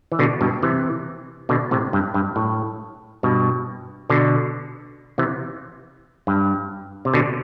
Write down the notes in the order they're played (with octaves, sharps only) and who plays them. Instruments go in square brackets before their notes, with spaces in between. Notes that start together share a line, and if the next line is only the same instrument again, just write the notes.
[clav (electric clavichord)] E3
B2 D3
G2 B2
C3 E3
B2 D3
A2 C3
G2
G2
A2
G2 B2
B2 D3
C3 E3
G2
C3
B2 D3